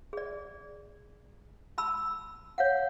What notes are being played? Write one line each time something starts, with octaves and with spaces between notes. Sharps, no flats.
G#4 D5
A5 B5 E6
C#5 F5 F#5